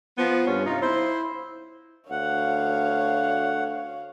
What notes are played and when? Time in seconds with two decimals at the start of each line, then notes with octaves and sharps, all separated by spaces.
0.18 F3 B3
0.47 G2 C#4
0.66 C3 D#4 F4
0.82 E4 C5
2.10 D2 C#5 F5 F#5